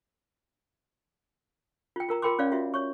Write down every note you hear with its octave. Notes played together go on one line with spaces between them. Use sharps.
F4 G5
F4 A#4 A#5
F4 A#4 G5 B5 C6 D6
C#4 C#5 D5 F5
F4 F#4 E5
C#5 C#6